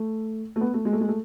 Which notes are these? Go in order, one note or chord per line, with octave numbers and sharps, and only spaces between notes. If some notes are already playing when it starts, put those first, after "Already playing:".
Already playing: A3
A3
B3
A3
G#3
A3
G#3
A3